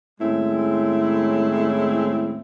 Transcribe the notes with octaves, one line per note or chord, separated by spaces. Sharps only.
D#2 A2 G#3 C4 C#4 E4